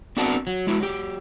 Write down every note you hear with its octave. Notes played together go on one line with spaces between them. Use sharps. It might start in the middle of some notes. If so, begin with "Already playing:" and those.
B3 C4 D4 F#4 A#4 A5
F#3
G#3 E4 F#4
F#3 G4